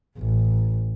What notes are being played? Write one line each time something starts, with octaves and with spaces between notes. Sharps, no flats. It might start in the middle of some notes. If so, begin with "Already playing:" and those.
A1